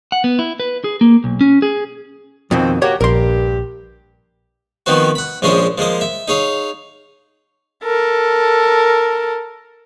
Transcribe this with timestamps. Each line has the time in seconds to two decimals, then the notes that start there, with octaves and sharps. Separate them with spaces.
0.12 F#5
0.24 B3
0.39 E4
0.60 B4
0.84 G#4
1.01 A#3
1.24 B1
1.41 C#4
1.62 G#4
2.51 F2 B2 D#3 F3 C4
2.82 A#3 F#4 G4 C#5 F#5
3.01 A#1 G2 G4 A#4 C6
4.86 D#3 F3 B3 C4 F#4
5.15 F#5 B5
5.42 A#1 F3 G#3 C#4 C5 D#5
5.78 F3 G#3 A#3 D#5
6.01 E5
6.28 D#4 G#4 C#5 F5
7.84 A4 A#4